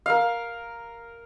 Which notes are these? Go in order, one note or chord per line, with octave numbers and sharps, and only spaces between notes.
A#4 F5